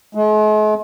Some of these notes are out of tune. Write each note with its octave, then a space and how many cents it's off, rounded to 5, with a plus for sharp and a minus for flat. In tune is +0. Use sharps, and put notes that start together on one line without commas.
G#3 +45